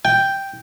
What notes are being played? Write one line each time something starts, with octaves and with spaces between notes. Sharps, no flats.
G5